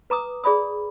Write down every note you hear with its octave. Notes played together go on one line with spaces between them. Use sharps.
B4 A#5 D6 D#6
G#4 D5 B5 D#6